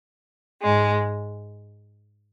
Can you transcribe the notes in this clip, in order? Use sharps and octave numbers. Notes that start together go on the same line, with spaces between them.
G#2 G#3